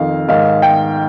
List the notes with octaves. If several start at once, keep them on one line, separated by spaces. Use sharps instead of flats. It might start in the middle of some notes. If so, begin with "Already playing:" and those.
Already playing: F2 D#3 F5
G#2 D#3 F5
G5